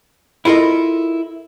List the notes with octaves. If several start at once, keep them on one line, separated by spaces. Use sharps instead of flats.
E4 F4 A4 A#4 D#5